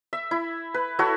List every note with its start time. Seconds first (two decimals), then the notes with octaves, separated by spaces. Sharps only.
0.13 E5
0.31 E4
0.74 B4
0.99 E4 F#4 A4 C#5